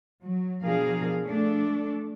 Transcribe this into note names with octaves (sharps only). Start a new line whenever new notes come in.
F#3
B2 F3 D4 G#4 A#4 F5
A3 D4 A4